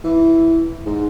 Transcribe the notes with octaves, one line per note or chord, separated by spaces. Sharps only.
E3
G#2